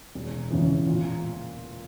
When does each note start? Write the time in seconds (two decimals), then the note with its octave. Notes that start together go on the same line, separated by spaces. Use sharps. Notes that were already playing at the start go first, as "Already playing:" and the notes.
0.15 E1
0.51 E2 C#3 E3
0.87 A#2